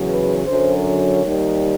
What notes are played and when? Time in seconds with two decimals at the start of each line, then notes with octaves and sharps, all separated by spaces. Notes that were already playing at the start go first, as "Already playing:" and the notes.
Already playing: E2 C#3 F#3
0.08 B4
0.46 F#2 D3 F#3 C5
0.84 C#5
1.23 D#2 D#3 G3